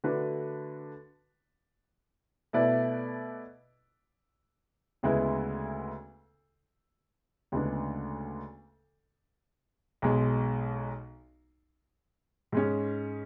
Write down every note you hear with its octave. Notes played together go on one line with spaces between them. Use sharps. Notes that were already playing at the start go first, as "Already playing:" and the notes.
D3 A3 D4 F#4 B4
B2 A3 E4 B4 D5
D2 C#3 G#3 B3 E4
D2 C#3 G#3 B3 D4
B1 B2 G#3
G#2 G#3 C#4